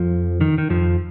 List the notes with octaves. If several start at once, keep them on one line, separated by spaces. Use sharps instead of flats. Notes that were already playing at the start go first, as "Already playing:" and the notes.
Already playing: F2 F3
D#3
D#3
F2 F3